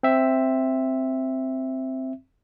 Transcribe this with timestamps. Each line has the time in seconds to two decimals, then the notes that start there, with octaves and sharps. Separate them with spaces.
0.03 C4 E5